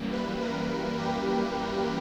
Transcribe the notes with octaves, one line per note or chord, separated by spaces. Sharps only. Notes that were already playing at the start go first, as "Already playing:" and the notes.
Already playing: F#2 E3 G3 A#3
B4
A#4
G4